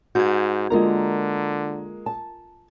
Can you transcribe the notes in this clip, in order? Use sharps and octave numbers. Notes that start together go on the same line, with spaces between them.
G#2 F#4 G6 G#6
D3 G#3 A#3 F4 A#4 A#5
A5